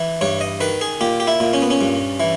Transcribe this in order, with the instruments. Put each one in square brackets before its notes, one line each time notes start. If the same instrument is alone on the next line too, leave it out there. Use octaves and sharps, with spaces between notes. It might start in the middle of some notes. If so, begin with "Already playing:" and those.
Already playing: [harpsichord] E3
G2 C#5
D#5
D#3 B4
G#4
A#2 G4
G4
E4
A#2
C#4
B3
C#4
G2
E3